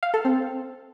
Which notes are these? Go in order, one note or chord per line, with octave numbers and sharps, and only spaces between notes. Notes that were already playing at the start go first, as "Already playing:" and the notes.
F5
A4
C4